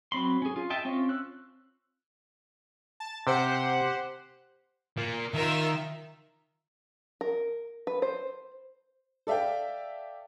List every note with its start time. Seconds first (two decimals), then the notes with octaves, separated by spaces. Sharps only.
0.12 F#3 C4 B5 C6
0.42 C#4 G#4
0.56 F4
0.70 D#5 E5 G5 A5
0.85 C4 C#4 F4
1.09 E6 F#6
3.00 A5
3.27 C3 G4 C5 F#5
4.97 A#3 F4
5.34 D#3 F4 A#4 E5
7.21 A#4
7.87 B4
8.02 C5
9.27 A4 D5 E5 F5 G5